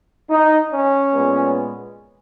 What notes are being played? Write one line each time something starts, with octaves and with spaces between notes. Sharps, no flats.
D#4
C#4
A#2 G#3 B3